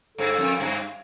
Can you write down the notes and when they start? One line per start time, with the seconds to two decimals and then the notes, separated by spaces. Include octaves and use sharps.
0.18 G2 A4
0.39 F2
0.60 G2